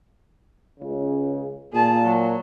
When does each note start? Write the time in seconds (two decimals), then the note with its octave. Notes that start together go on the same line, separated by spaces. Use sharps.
0.80 C#2 C#3
1.73 A#2 G#4 A5
2.04 F#3